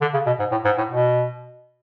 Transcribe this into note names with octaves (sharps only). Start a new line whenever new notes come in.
D3
C#3
B2
G#2
A2
G#2
A2
B2